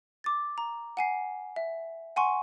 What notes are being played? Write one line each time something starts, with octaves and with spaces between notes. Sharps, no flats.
D6 A6
A#5
F#5 G#5 C7
E5
F#5 G#5 C6 C#6